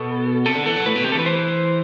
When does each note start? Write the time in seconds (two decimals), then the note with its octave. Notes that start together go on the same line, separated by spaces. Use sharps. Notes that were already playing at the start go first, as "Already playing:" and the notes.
Already playing: B2 A4
0.46 C3 A4
0.55 D3
0.66 E3 A4
0.76 F#3
0.86 A2 B4
0.95 B2
1.04 C3 G4
1.12 A4
1.15 E3 B4
1.26 C5